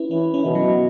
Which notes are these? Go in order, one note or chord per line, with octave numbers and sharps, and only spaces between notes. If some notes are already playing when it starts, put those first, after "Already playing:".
Already playing: C#4 E4 B4
E3 C#4
C#4
B2
F#3